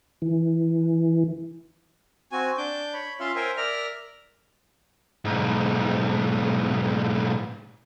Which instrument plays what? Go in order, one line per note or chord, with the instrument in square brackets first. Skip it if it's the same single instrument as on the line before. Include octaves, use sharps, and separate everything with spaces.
[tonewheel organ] E3
[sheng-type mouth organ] C4 F#4 G#5
D4 D6 G6
C#5 B5
C#4 F4 E5 F5 C6
A#4 C5 E5 G5 G#5
A#4 D5 E5 A#5 F6
[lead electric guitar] B1 G#2